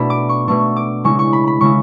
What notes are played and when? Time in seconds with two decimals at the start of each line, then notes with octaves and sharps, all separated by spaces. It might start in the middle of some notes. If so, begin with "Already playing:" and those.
Already playing: B2 A3 D4 B5
0.10 D6
0.29 C#6
0.48 B2 A3 D4 C#6
0.76 D6
1.04 C#3 G#3 C#4 E4 C#6
1.19 C#6
1.33 B5
1.47 B5
1.61 C#3 G#3 C#4 E4 C#6